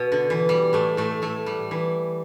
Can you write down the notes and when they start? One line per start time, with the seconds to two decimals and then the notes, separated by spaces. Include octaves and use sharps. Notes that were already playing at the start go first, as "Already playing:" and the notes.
Already playing: B2
0.12 D3
0.30 E3
0.49 G3
0.73 A2 A3
0.97 A2 A3
1.22 A2 A3
1.46 G3
1.71 E3